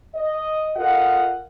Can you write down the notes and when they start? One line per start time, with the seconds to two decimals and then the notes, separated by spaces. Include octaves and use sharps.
0.15 D#5
0.76 F4 A4 A#4 D#5 F5 F#5